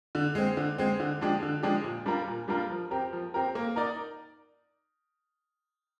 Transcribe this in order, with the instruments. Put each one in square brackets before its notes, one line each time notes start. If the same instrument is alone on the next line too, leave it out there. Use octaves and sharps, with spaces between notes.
[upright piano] D3
G#3 C4
D3
G#3 C4
D3
F3 G#3 D4 G4
D3
F3 G#3 D4 G4
A#2
G3 D4 F4 A#4
A#2
G3 D4 F4 A#4
F3
C4 G4 A#4
F3
C4 G4 A#4
A#3
D#4 A#4 D5